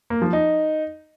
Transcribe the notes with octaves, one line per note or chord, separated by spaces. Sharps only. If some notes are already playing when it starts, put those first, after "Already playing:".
A#3
F3
D#4